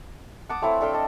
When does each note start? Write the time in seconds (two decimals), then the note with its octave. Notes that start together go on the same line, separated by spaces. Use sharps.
0.49 F#5 A5 D6 D#6
0.62 A3 C4 E4 C#5
0.81 D4 A4 F5 G5
0.93 D4 D#5